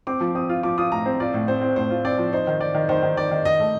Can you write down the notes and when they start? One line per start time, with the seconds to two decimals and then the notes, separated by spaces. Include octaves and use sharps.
0.07 C4 D6
0.20 F3
0.35 C4 D#6
0.49 F4
0.63 F3 D6
0.78 F4 D#6
0.92 A2 A#5
1.05 C4 C5
1.20 F4 D5
1.34 A2
1.48 C4 C5
1.61 C4
1.76 A2 C5
1.90 F4
2.05 C4 D5
2.18 F3
2.33 D#4 C5
2.47 D#3
2.60 D#3 D5
2.74 D#3
2.89 D#3 C5
3.03 D#3
3.16 D#3 D5
3.31 D#3
3.45 D#3 D#5
3.60 A3